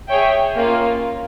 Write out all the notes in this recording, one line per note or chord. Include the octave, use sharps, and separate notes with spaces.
G#4 C#5 E5 G5
A#3 C#4 F4